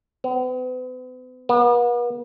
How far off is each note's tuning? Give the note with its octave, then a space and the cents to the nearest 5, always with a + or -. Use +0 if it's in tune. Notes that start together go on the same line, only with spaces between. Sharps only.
B3 +45
B3 -40